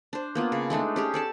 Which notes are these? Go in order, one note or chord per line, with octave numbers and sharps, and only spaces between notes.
D4 C5
A#3 B3 F4
C#3
G#3 A3 D4 D#4
C#4 G4 G#4
A4 D5 A5